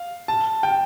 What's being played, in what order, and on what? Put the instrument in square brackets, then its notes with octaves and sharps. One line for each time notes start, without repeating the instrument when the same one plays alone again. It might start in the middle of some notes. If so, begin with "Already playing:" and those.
Already playing: [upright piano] F5
A5
G5